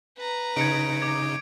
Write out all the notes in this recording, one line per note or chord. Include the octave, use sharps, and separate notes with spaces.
B4 A#5
C#3 D#4 G#6 C#7 D7
D6 G#6